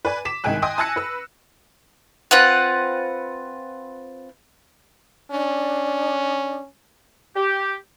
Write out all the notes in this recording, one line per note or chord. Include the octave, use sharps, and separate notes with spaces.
B4 D5 G#5
D6 B6 E7
C2 G#2 D#3 G5 G#5 F#6
D#5 G5 G#5 C6 D#6
G#5 A5 E6 F#6 A#6 C#7
B4 E6
C4 F4 B4 F#5
C#4 D4
G4